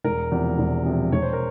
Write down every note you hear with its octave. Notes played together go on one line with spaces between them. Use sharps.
E1 A#4
E2 C3 F3
E1
E2 C3 F3
E1 C#5
C5
A#4